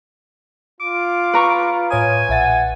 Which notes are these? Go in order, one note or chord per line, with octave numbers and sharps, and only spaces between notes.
F4 D6
B4 A#5 C#6
A2 C#5 G#5 D#6
A#1 E5 F#5 A6